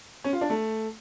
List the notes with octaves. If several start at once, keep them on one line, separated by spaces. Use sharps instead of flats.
C#4
F4
D4
A3